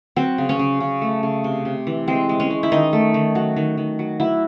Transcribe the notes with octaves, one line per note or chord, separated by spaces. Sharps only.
F#3 C4
C#3
C#4
C#3
C#3
A3
C#3
C3
C3
E3
G#3 C4
G#3
C#4
G#3
E4
D#3 D#4
A3
D#3
F#3
D#3
D#3
F#3
F#3 E4